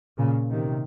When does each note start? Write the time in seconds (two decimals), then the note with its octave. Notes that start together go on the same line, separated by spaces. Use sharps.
0.18 A#2 C#3
0.50 C3 D#3